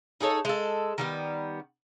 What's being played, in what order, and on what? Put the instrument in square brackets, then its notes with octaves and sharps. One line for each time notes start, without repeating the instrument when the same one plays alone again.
[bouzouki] D#4 G#4 A4 C#5
G#3 A4
D#3 G3 B3